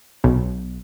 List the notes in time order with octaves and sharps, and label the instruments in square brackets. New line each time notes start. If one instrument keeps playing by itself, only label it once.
[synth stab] B1